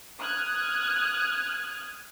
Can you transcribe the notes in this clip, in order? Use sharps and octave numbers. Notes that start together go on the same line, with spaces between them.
D#6 F6 F#6 G#6